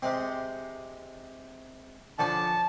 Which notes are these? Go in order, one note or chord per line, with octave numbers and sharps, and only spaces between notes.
C3 G#3 C4
D3 F3 C#4 A5